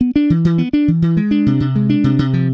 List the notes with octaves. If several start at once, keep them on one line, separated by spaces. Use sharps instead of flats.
B3
D4
E3
E3
B3
D4
E3
E3
G#3
D4
C3
C3
G#3
D4
C3
C3
F3